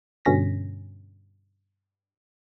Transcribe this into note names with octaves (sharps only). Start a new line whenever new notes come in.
G2 B2 D3 C#4 A#6 B6